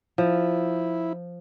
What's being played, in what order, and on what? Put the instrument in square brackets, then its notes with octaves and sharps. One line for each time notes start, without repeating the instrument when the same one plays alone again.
[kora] F3 [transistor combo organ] E4